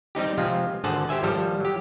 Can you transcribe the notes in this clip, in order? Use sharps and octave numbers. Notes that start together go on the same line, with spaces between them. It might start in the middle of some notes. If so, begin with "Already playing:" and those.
G3 C4 D#4 G4
C3 F3 G#3 C4 F4
G#1 D3 G#4 C5 F#5 A5
G4 C5 E5 G#5
G#1 F3 G3 A4
F#3 G4